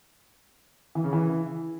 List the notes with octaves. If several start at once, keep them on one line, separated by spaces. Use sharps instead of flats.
E3
C#3
E3